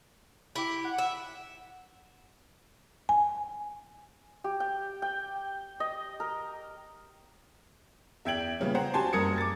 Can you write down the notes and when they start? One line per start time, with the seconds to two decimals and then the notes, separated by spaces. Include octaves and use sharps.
0.56 E4 G4
0.84 F#5
0.98 E5
3.09 G#5
4.44 G4
4.60 G5
5.02 G5
5.80 D#5
6.20 A#4
8.25 E2 E5 G5 G#6 D7 F#7
8.60 A#2 C#3 G3 B3
8.75 C5 F#5 G5 A#5
8.94 F#4 G4 G#5 A5 C6
9.13 F#1 G2 A#4 D#6 G#6 C#7
9.38 D6 A6